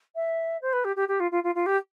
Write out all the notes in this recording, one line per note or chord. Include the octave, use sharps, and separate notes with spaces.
E5
C5
B4
G4
G4
G4
F4
F4
F4
F4
G4